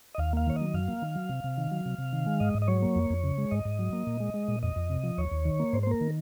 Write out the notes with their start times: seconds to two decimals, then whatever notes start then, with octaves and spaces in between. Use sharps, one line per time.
0.15 D#5
0.18 D#2 F5
0.33 A#3 F5
0.47 D#3 C#5
0.56 F#3 D#5
0.74 F#2 F5
0.88 A#3
1.02 D#3
1.15 F#3
1.29 C3
1.44 C3
1.58 D#3
1.71 F#3
1.86 C3
1.98 C3
2.13 D#3
2.26 G#3
2.40 G#2 D#5
2.54 G#2
2.62 D#5
2.68 F#3 C#5
2.82 A#3
2.96 F2
3.10 F2
3.24 C#3
3.38 G#3
3.51 G#2 D#5
3.65 G#2
3.79 F#3
3.93 A#3
4.07 A#2
4.20 G#3
4.34 G#3
4.48 A#2
4.63 F2 D#5
4.76 F2
4.90 C3
5.03 F3
5.18 D#2 C#5
5.31 D#2
5.45 D#3
5.60 A#3
5.73 G#2 C5
5.83 C5
5.87 A#3 A#4
6.01 D#3